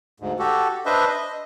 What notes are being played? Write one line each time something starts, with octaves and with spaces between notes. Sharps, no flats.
D2 G#2
F#4 G4 A4
D4 B4 C5 D#5 E5
D#5